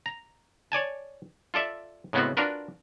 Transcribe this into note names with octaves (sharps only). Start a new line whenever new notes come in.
A#5
C#5 D5 G#5 A5
F4 A4 D5 E5
A2 C#3 G#3 B3 C4 F#4
D4 F4 F#4 A#4 B4